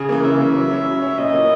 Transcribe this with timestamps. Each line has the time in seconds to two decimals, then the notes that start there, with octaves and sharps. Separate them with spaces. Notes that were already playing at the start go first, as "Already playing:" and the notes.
Already playing: C#3 G#4
0.09 E3 A#3
0.25 C#3 E5
0.41 E3 A#3
0.56 F#3
0.71 C#4 E4
0.87 F#3
1.02 C#4 E4
1.18 A#2 D#5
1.33 A#3 E4